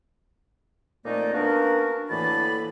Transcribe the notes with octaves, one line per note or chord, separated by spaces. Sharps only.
F2 A#2 A3 A#3 D#4 D5
A#3 B3 C#4 D4 F#4 A#4
D2 A2 E3 A#3 A5 B5